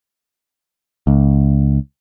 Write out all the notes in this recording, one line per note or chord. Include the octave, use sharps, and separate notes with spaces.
C#2